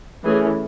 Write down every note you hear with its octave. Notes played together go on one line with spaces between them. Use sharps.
E3 A3 C#4 G#4